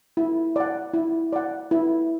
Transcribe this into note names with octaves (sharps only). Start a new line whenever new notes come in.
E4
D5 F#5
E4
D5 F#5
E4